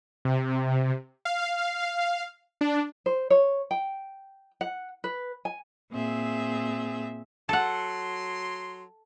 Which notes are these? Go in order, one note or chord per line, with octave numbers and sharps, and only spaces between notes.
C3
F5
D4
C5
C#5
G5
F#5
B4
G#5
A#2 C4 G#4 E5
F#3 A4 F#5 C6